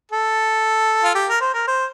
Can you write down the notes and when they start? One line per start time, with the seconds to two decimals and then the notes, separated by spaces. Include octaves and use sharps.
0.12 A4
1.04 F4
1.15 G4
1.29 A#4
1.41 C5
1.54 A#4
1.67 C5